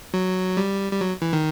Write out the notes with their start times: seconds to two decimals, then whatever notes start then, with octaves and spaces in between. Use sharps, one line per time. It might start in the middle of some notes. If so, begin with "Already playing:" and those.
0.14 F#3
0.57 G3
0.92 G3
1.01 F#3
1.22 E3
1.33 D#3